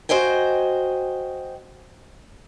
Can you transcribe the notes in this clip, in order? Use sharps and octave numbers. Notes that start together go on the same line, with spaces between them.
F#4 A#4 C5 D#5 G5 G#5